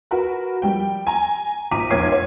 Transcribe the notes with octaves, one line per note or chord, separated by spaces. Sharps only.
F#4 A#4 B4
F3 G3 G5
G#5 A#5
G#1 A#2 A#5 D6 B6 D#7
F1 A#1 C#5 D6 G#6 C7
C#5